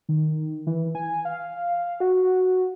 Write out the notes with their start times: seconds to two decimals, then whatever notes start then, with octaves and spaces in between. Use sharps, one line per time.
0.09 D#3
0.67 E3
0.95 G#5
1.25 F5
2.00 F#4